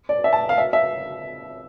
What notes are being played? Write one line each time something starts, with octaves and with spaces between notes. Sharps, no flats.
D5
E5
A5
F5
E5
E5